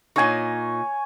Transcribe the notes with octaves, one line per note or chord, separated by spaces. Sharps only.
A#2 D#4 C#5 G#5